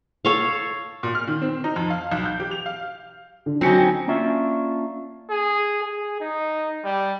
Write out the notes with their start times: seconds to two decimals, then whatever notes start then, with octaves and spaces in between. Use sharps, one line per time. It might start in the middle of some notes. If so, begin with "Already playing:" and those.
0.25 A4 C#5 F5
1.03 A#2
1.15 F6
1.27 D#3
1.42 C4
1.64 D#4
1.76 F2
1.90 F5
2.12 B1
2.25 G6
2.40 G4
2.51 F7
2.66 F5
3.46 D3
3.61 F#3 C4 C#4 D#4 C#7
3.78 G5
4.07 A#3 C#4 D4 F4 E5
5.30 G#4
5.82 G#4
6.21 D#4
6.84 G3